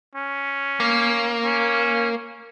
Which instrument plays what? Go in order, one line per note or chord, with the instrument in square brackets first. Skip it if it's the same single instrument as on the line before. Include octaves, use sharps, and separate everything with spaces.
[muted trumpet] C#4
[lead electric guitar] A#3
[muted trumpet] C#4